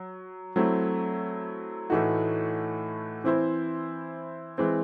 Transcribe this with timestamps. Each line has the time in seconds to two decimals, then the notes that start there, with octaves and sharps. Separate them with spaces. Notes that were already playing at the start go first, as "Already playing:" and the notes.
Already playing: F#3
0.56 F#3 A3 C4 E4
1.90 A2 E3 A3 D#4 F#4
3.24 E3 C4 E4 C5
4.58 E3 G#3 C4